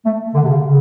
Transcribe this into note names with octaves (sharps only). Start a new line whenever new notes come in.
A3
D3
C3
C#3
C#3